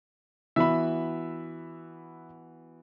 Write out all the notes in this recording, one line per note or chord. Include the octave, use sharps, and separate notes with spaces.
E3 B3 F#4 E5 B5